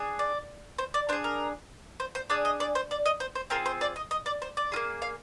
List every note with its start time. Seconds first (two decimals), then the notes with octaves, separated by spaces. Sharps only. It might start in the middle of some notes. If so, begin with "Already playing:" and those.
Already playing: D4 G#4
0.19 D5
0.78 C5
0.94 D5
1.09 D4 C5
1.13 G#4
1.24 A#4
2.00 C5
2.15 C5
2.30 D4 G#4 D5
2.45 D#5
2.60 D5
2.75 C5
2.91 D5
3.06 D#5
3.20 C5
3.35 C5
3.50 C4 F4 G#4 A#4
3.66 C5
3.81 D5
3.96 D#5
4.11 D#5
4.26 D5
4.42 C5
4.57 D5
4.72 F4 G#4
4.76 A#3
5.02 F5